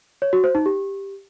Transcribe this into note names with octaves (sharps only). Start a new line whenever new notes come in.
C#5
F#4
C5
D#4
G4